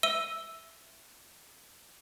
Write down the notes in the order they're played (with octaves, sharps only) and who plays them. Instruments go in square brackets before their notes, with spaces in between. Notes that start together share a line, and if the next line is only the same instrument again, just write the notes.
[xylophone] E5 E6 D#7 G7